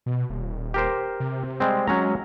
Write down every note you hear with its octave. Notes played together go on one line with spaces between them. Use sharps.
B2
D#1
G4 A#4 C5
C3
G3 G#3 C4
F#3 G#3 C#4 A#5